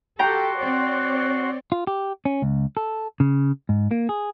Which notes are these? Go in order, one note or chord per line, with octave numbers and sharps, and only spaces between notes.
F#4 G4 A4 F#5 G5 A#5 C6
C4 C#5 D5
F4
G4
C#4
C#2
A4
C#3
G#2
A#3
G#4